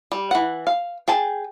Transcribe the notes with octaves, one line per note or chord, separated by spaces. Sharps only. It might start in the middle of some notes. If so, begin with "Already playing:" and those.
G3
E3 F#5
F5
G#4 G5 A5